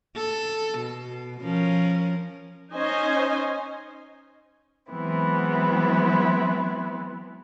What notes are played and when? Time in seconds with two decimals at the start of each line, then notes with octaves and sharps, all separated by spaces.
0.16 A4
0.79 B2
1.42 F3 C#4 A#4
2.71 C#4 D#4 C5 D#5 G#5
4.91 E3 F#3 G#3 B3 C4 E4